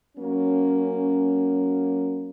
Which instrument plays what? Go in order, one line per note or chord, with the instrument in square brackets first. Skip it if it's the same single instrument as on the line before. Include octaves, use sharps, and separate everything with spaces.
[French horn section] F#3 A#3 C#4